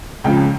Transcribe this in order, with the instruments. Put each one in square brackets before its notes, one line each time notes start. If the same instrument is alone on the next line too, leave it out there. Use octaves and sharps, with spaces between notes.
[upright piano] C#2 C#3 F3 G5